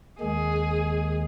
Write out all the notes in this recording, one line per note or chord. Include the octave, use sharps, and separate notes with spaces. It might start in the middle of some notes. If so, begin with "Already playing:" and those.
D#2 D#3 G#3 G#4